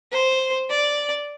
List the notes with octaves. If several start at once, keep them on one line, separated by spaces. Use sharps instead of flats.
C5
D5